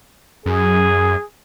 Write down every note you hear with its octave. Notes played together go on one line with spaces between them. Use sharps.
F#2 G#4